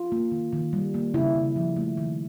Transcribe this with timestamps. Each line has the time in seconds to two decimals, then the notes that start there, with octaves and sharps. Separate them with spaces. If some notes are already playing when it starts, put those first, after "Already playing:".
Already playing: F4
0.12 A#3
0.32 D#3
0.52 D#3
0.73 G3
0.94 A#3
1.14 C#3 E4
1.35 C#3
1.56 F3
1.77 A3
1.97 D#3